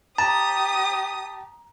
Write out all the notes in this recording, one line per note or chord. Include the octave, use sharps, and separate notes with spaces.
G4 A5 A#5 D#6